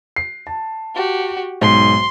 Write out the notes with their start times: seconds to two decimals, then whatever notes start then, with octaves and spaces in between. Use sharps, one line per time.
0.16 C7
0.47 A5
0.96 F#4 G4
1.61 B1 G#2 C6